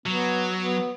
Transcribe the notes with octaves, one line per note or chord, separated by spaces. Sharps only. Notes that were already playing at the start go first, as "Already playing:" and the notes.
F#3 B3
B3